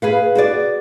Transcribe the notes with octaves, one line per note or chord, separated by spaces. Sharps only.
G#4 B4 F5
F#4 G#4 D5